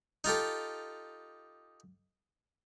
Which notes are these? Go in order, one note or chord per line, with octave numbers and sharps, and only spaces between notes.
D#4 F4 G4 A4